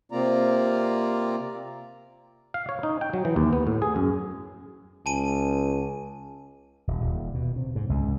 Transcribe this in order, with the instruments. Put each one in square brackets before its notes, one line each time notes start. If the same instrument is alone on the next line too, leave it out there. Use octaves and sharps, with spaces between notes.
[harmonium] C3 A#3 C4 F4 D5 A#5
[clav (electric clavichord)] F5
C#5
D#4
G5
F#3
E3
D#2
B3
A2
G#4
F#2
[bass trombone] C#2 [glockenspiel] G#5 A5 D#7
[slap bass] D#1
D#1
B2
C3
G#2
C#2